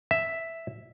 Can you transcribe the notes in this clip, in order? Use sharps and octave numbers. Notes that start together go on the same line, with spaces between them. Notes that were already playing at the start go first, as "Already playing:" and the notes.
E5